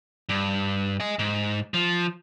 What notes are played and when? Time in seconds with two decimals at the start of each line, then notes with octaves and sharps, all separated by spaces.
0.29 G2
1.00 D#5 G#5
1.19 G#2
1.74 F3